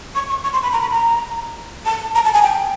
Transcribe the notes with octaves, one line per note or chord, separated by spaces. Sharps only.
C#6
C#6
C#6
C6
B5
A#5
B5
A#5
A5
A#5
A5
G#5
G5